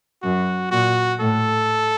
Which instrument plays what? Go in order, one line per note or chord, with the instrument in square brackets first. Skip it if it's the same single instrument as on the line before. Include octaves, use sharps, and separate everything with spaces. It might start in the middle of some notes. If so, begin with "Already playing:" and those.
[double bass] F#2 [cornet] F#4
[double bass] A#2 [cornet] F#4
[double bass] A2 [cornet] A4